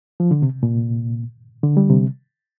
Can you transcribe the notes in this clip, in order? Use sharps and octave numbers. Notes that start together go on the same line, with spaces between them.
F3
D3
C3
A#2
D3
G3
C3